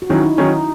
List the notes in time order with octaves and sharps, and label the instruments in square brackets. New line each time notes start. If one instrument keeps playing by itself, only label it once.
[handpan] F#4
[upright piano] D#3 F#3 C#4 [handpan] E4
[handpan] D#4
[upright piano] D#3 F#3 C#4 [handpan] D#4